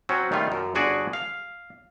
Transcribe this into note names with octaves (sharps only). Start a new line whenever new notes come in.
F#3 C4 C#4 F#4
D#3 G3 A3 F4
F#2
G1 D3 F#4 G#4 D5
F5